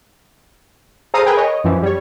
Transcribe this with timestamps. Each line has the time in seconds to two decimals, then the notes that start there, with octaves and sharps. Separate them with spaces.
1.14 G#4 A4 C5 F5 A#5 D#6
1.25 G#4 A#4 B4 G5 G#5
1.37 C#5 D#5
1.64 F#2 E3 F3
1.82 G3 C#5